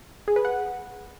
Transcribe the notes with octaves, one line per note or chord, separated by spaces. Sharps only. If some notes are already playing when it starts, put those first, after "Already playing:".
G#4
B4
F#5